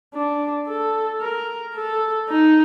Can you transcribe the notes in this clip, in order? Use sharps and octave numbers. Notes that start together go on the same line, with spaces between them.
D4
A4
A#4
A4
D#4